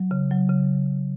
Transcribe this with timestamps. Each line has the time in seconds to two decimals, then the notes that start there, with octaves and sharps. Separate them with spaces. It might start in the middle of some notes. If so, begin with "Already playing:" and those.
Already playing: F#3
0.11 C#3
0.31 F#3
0.49 C#3